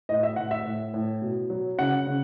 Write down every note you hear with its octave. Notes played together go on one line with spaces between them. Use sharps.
A2 D#5
E5
A2 F#5
E5
A2
A2
B2
F#3
C#3 F#5
C#3